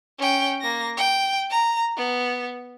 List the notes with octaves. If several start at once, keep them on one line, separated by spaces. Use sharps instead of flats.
C#4 G5
A#3 A#6
G5
A#5
B3